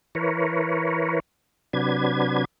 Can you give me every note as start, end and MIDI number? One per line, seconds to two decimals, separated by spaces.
0.15 1.20 52
0.15 1.20 70
0.15 1.20 71
0.15 1.20 73
1.73 2.45 48
1.73 2.45 54
1.73 2.45 62
1.73 2.45 71
1.73 2.45 92